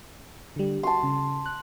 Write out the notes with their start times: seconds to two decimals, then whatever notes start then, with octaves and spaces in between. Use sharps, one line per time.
0.56 D3 G3
0.83 F#4 A5 C6
1.03 C#3
1.46 F#6